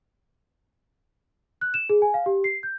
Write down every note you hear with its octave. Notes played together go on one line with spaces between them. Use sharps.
F#6
E7
G#4
G#5
F5
G4
C7
G6